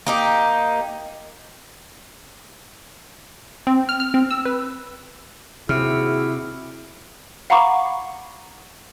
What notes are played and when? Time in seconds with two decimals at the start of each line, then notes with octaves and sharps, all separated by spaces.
0.06 A#3 D#4 G4
3.67 C4
3.89 F6
4.00 F6
4.14 C4
4.31 E6
4.45 B4
5.69 D#2 C3 E4 F#4 G#4 F6
7.50 F5 F#5 A#5 B5 C#6 D6